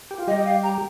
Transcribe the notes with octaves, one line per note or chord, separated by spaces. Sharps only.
G4
F4
G3 G4 D#5
D#5
F5
A#5